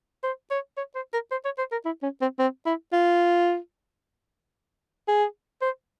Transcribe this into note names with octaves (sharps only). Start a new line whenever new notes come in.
C5
C#5
C#5
C5
A#4
C5
C#5
C5
A#4
E4
C#4
C4
C4
E4
F4
G#4
C5